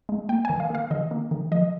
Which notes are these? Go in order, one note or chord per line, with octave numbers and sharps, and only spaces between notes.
G#3
A#3 G5
D#3 G#5
F5
A#3 F5
D#3 D#5
A#3
D#3
F3 D#5